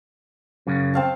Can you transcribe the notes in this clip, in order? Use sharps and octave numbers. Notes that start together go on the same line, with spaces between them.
F#2 C#3
C4 F5 A5